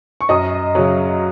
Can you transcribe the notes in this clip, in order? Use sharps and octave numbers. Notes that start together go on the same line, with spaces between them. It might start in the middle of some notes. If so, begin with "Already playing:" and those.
C#6
F#2 D#5 D#6
C#3 F#3